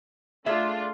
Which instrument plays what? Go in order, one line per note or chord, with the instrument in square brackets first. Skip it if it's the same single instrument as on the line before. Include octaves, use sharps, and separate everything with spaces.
[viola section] A3 D4 F4 [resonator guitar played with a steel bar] G#4 E5